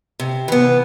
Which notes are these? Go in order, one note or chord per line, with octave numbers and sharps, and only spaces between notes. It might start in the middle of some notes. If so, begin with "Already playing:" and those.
C3
E3 B3